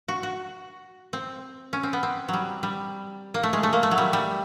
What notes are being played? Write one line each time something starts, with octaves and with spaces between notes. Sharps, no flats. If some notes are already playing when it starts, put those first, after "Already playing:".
F#4
F#4
C4
C#4
C4
B3
C4
F#3 G3
G3
A#3
A3
G#3
A3
A#3
A3
F#3
G3
G3